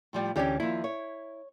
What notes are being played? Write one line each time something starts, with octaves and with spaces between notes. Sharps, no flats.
A2 F3 G3
D2 E3 C#4 G4 D5
D#2 F3 E4
C#5